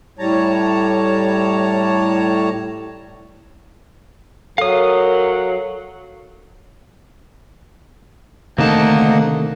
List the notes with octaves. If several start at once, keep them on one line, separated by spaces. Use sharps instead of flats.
A2 G3 C#5 A5 A#5
F#3 A4 A#4 C#5 F5 D#6
D2 C3 D#3 A3 A#3 D#4 F#5 A5